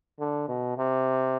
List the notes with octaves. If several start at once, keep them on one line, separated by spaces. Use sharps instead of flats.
D3
B2
C3